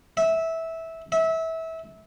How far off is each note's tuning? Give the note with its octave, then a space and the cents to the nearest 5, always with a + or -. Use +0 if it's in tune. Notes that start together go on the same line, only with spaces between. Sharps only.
E5 -15
E5 -25